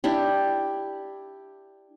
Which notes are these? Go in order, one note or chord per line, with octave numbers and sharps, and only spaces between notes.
D4 E4 G4